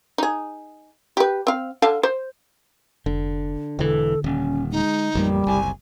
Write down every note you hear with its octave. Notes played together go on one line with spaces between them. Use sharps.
D#4 G#4
G4 B4
C4 F5
D3 F5 A5
C5
F1 D3
E1 D3 E3 A4
D#1 C#4
G#3 D#4
A1 F2 G3 A#3
F#1 C2 G#5